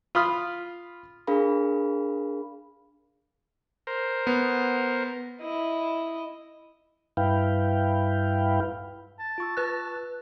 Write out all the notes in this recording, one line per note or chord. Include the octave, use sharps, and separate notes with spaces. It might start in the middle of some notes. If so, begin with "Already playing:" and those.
F4 B5 D#6 F6
D4 G#4 A#4 F5 B5
A#4 C5
B3
E4 D#5
G2 E4 B4 F5 G5
A5
F4 C#6 E6
B4 A5 F#6